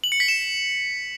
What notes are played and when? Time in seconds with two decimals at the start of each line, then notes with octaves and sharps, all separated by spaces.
0.04 F#7
0.12 C#7
0.20 B6
0.28 E7